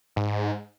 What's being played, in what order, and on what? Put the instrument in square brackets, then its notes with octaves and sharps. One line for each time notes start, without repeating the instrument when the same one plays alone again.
[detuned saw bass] G#2